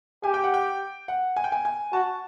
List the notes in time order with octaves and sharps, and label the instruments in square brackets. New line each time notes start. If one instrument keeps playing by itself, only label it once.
[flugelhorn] G4 [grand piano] G#5
[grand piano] G5
F#5
G5
F#5
G#5
G5
G#5
G#5
[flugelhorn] F#4 [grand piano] A5